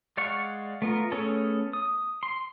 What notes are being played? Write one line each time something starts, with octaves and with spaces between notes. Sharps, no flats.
G#3 D5 F5 F#5 C#6
A3 B3 F4 A#4
A3 B3 C#4 G#4 A4
D#6
C6